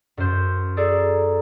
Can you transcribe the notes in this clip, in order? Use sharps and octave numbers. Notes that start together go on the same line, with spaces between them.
F#2 C5
G#4 A4 D5 A#5